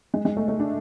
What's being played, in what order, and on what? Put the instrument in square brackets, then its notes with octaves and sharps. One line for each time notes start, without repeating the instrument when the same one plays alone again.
[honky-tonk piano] G#3
G#3
A3
A3
D4